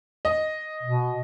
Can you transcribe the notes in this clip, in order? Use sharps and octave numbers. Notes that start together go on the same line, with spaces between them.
D#5
B2